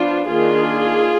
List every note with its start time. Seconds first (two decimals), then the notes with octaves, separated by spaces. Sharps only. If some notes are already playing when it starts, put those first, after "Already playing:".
Already playing: F3 B3 D4 F4
0.30 D#3 A#3 D4 F4 G#4